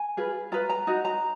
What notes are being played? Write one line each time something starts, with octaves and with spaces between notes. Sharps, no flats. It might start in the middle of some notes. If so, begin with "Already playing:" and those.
Already playing: G#5
F4 G#4 B4
F4 B4 A#5
A#5
D#4 F#4
A#5